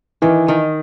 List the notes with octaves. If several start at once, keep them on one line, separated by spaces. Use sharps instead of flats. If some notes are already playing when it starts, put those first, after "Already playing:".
D#3 E3
D#3